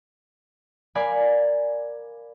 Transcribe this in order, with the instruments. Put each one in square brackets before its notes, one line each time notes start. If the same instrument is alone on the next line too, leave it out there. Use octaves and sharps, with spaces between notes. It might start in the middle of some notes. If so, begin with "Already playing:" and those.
[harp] A#4 D5 F5 G#5 B5